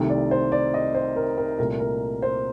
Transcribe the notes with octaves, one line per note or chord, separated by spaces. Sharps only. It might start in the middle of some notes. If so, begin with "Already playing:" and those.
Already playing: C2 C3 D#3 A3
D5
C5
D5
D#5
C5
A#4
A#4
C2 A#2 A3 A#4
A#4
C5